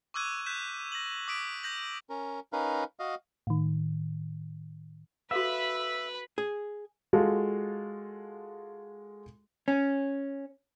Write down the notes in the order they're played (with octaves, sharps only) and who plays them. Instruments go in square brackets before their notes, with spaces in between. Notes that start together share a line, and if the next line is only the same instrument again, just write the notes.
[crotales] C#6 D6 E6 F#6 G#6 D#7
F#6 G6 B6 E7
A#6 F#7
D6 D#6 B6 D7
G6 A#6 F#7
[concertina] C#4 A#4
C#4 D#4 A#4 B4 F5
F#4 D#5 F5
[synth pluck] A2 D#3
[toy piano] F#4 A4 F5 [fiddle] B4 B5 [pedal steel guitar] E5
[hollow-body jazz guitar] G#4
[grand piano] G#3 F4 F#4 A4
[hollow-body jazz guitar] C#4